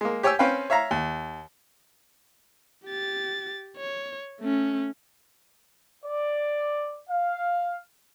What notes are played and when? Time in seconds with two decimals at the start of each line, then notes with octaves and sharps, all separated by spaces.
0.01 G#3 A#3
0.23 G4 C#5 G5 G#5 E6
0.39 C4 C#4 B4 F5 G5
0.70 C#5 E5 F5 A#5
0.91 D#2
2.86 G4 A6
3.77 C#5
4.40 A3 C#4
6.05 D5
7.10 F5